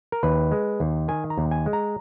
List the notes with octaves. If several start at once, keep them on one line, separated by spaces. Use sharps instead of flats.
A#4
D#2 B4
G#3
D#2
D#3 G#5
A#5
D#2
G#5
G#3
A#5